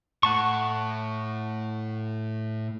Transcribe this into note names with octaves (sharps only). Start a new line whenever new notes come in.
A2 F#5 A5 C#6